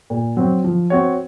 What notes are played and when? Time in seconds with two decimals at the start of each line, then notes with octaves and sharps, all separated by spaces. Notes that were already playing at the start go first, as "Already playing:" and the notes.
0.10 A#2
0.37 F#3 C4
0.64 F3
0.90 C4 F#4 C#5